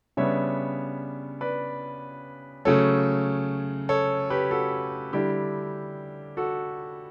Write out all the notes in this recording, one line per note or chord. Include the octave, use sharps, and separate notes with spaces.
C#3 G3 B3 D4 C#5 E5
B4 D5
C#3 F#3 A3 A4 C#5
A4 C#5
G4 B4
F#4 A4
D3 G3 D4 E4 G4
F#4 A4